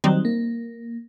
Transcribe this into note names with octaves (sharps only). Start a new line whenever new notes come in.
D#3 F#3 G3 C4 D#4
A#3